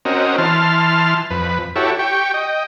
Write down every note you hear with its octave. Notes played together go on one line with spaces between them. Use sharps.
C4 C#4 F#4 A#4 D#5
E3 A5 C6 F6
F2 B4
E4 F#4 G4 A4 C#5
G4 G5 C#6
D#5 G5